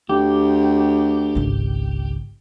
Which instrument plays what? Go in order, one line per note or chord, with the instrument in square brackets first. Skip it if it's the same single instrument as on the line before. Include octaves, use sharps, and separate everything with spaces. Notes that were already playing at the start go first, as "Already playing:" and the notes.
[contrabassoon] D2 [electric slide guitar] G4
[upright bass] G#1 C#2